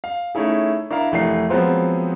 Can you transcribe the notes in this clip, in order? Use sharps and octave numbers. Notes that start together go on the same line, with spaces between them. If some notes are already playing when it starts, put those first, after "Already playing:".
F5
A3 C#4 D#4 E4 G#4
D4 E4 A#4 F5 A#5
F1 E3 A3 A#4 C7
F3 F#3 G#3 B3 C4 F4